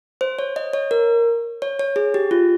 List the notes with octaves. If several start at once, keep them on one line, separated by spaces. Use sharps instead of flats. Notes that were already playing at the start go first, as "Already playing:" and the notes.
C5
C#5
D#5
C#5
A#4
C#5
C#5
G#4
G4
F4